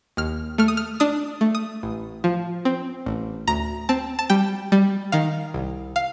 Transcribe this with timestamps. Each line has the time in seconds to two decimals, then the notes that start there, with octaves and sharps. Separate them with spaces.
0.17 D#2 F6
0.58 A3 F6
0.68 D#6
0.77 F6
1.00 D4 D#6
1.41 A3
1.55 D#6
1.83 A1
2.24 F3
2.65 C4
3.06 A1
3.47 D2 A#5
3.89 C4 A5
4.19 A5
4.30 G3 G5
4.72 G3
5.12 D#3 F5
5.54 C2
5.96 F5